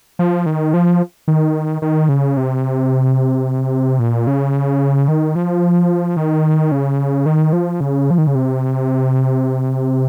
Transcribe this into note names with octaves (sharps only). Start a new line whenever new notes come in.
F3
D#3
F3
D#3
D#3
C#3
C3
A#2
C#3
D#3
F3
D#3
C#3
D#3
F3
C#3
F3
D#3
C#3
C3